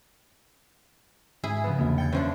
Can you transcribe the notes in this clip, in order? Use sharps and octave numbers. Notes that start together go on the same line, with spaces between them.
G#2 E4 G#4
C#3 F3 B3 B4
E2 D3 A#3 C4 F#4
G5 G#6 A6 C#7
F#2 F3 D4 B4 E5